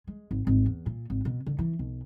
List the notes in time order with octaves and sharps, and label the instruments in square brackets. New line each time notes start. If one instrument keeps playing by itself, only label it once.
[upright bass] G#3
G#1
G#1
E2
A#2
G#1
B2
D3
E3
B1